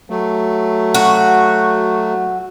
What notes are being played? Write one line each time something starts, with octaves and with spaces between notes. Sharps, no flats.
F#3 A3
F#4